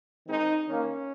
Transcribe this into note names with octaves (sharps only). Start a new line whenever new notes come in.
D#3 G#3 C4 D#4
D#3 A#3 C#4